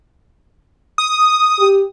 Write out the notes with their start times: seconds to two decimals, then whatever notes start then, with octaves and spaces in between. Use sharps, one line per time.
0.98 D#6
1.60 G4